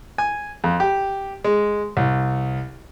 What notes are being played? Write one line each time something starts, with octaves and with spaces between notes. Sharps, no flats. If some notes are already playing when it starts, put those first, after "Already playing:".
G#5
F2
G4
G#3
C2